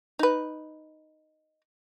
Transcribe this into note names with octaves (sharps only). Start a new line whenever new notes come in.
D#4 B4